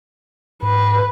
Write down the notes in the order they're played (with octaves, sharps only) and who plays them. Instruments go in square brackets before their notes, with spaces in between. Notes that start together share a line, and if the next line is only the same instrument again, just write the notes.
[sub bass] G#2 [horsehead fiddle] B4